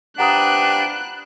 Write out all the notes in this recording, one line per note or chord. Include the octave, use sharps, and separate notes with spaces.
F3 D4 G4 B4 F#5 A#5 D#6 F#6